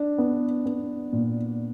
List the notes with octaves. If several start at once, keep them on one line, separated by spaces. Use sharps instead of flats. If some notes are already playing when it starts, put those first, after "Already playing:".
Already playing: D4
B3
B3
A#2